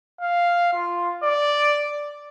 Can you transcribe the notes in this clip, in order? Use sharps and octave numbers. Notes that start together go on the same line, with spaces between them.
F5
F4
D5